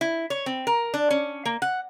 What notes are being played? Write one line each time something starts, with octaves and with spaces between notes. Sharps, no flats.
E4
C#5
C4
A#4
D4
C#4
A#3
F#5